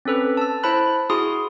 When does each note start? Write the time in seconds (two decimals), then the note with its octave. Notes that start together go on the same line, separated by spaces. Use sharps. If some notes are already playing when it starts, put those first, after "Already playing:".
0.05 C4 C#4 A4 B4
0.37 A5 E6
0.63 E4 C5 A5 B5 F#6
1.10 E4 F#4 G#4 C6 D#6